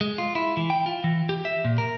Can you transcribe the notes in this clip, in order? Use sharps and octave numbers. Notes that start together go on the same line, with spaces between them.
G#3
F4
E4
E3
G5
F4
E3
G4
E5
A#2
A#4